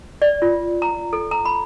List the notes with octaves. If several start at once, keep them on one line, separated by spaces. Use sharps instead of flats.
D5
F4
A#5
A4
A#5
B5